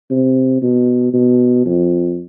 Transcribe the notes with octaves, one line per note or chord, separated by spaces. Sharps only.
C3
B2
B2
F2